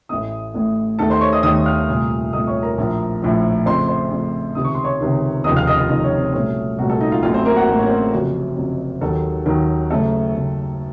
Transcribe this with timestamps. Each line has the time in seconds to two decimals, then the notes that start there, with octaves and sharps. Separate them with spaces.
0.09 A1 A2 A3 D#5 D#6
0.54 A1 A2 A3
0.99 D#2 D#3 A3 A4 A5
1.10 C5 C6
1.21 C#5 C#6
1.32 D#5 D#6
1.43 D#2 D#3 A3 D#5 D#6
1.66 F5 F6
1.88 C2 A#2 A3
2.33 C2 A#2 A3 D#5 D#6
2.47 C#5 C#6
2.63 A#4 A#5
2.78 A#1 A2 F3
3.22 A#1 A2 F3
3.66 F2 C#3 A3 C5 C6
3.88 C5 C6
4.11 F2 C#3 A3
4.55 C#2 C3 D#3 D#6
4.65 C#6
4.75 C6
4.84 C#5 C#6
5.01 C#2 C3 D#3
5.44 F1 D#2 C#3 F3 D#5 D#6
5.56 F5 F6
5.67 D#5 D#6
5.78 F4 F5
5.89 F1 D#2 C#3 F3 D#4 D#5
6.04 C#4 C#5
6.19 C4 C5
6.33 C2 A#2 F#3 A3 C#4 C#5
6.78 C2 A#2 F#3 A3 F#4
6.90 A4
7.01 D#4 D#5
7.11 F4 F5
7.22 A1 A2 F#3 A3 F4 F5
7.34 C4 C5
7.45 A#3 A#4
7.56 F#4 F#5
7.68 A1 A2 F#3 A3
7.79 C#4 C#5
7.86 A#4
7.90 C4 C5
8.01 A4
8.12 F#1 F2 C3 F#3 F#4
8.56 F#1 F2 C3 F#3
9.01 D#2 D#3 F#3 A4
9.46 D#2 D#3 F#3
9.90 F#1 F#2 C#3 A3 A4
10.35 F#1 F#2 C#3 A3